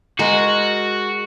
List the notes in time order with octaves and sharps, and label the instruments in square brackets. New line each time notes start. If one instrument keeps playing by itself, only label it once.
[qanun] G#3 G#4 A#4 [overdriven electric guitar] F#4